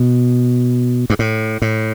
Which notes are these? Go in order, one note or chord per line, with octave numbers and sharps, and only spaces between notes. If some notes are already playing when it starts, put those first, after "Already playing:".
Already playing: B2
G2
A2
A2